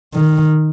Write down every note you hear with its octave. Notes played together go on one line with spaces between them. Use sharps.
D#3